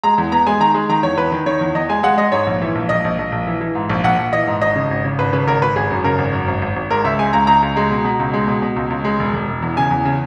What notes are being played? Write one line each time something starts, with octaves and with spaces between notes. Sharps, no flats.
G#3 A#5
E2
B3 A#5
G#3 G#5
D#3 A#5
G#3
D#3 A#5
E2 C#5
E2 B4
D#3
D#3 C#5
E2
E2 D#5
G#3 G#5
G#3 F#5
G#3 D#5
G#2 C#5
A#1
E3
A#1
A#1 D#5
A#1
A#1
A#1
E3
E3
G#2
A#1
A#1 F#5
A#1
E3 D#5
G#2
G#1 D#5
C#3
G#1
C#3
G#1 B4
C#3 B4
G#1 A#4
G#1 B4
G#1 G#4
F#2
C#3 A#4
G#1
F#2
G#1
G#1
G#1
G#3 A#4
C#2 E5
G#3 G#5
C#2 A#5
C#2 A#5
C#2
G#3
B2
B2
C#2
G#3
B2
B2
C#2
C#2
G#3
E1
E1
E1
E2
C#3 G#5
E2
C#3